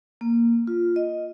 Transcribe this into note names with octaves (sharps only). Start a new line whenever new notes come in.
A#3
F4
D#5